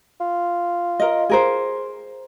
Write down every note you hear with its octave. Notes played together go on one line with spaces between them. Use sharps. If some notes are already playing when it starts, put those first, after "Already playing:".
F4
A#4 D#5
G#4 A#4 C5